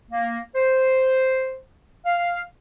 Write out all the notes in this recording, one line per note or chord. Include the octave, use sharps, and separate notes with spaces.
A#3
C5
F5